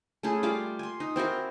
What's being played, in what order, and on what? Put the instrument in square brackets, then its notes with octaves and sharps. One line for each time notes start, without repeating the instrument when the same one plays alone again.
[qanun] A3 C#4 E4 G#4
G3 F4 F5 D6
G#5 C6
D#4
C4 E4 F#4 A#4